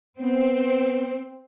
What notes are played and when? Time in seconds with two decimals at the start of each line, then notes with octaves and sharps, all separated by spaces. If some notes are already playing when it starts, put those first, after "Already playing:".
0.19 B3 C4